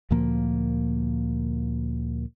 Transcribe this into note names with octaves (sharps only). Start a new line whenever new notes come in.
D2 A#2 F3 A#3